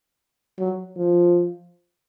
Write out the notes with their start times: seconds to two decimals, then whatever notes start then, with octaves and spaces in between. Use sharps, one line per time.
0.59 F#3
0.97 F3